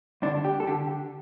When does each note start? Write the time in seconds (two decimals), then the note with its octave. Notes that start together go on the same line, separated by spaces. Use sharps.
0.22 G2 D3 D4
0.45 G4
0.60 A4
0.67 D3 G4